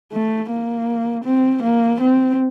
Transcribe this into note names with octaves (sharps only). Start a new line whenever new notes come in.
A3
A#3
C4
A#3
C4